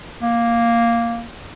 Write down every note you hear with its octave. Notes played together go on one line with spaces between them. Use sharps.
A#3